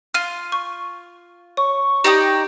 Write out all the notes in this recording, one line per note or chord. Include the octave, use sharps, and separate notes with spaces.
F4 F6 D#7
C#6
C#5 C#6
D#4 G4 D5 G5 D#6